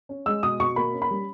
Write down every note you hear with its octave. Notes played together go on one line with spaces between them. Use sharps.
C#4
G#3 E6
B2 D#6
B2 C#6
A#3 B5
C#4
B5
G3